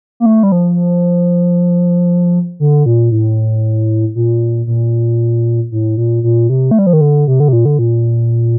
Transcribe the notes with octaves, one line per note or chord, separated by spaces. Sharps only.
A#3
A3
G3
F3
D3
A#2
A2
A#2
A#2
A2
A#2
A#2
C3
A3
G3
F3
D#3
D3
C3
D3
C3
A#2
D3
A#2